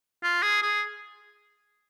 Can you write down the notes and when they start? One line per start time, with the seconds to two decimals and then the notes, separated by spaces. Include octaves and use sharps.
0.24 F4
0.43 G#4
0.62 G#4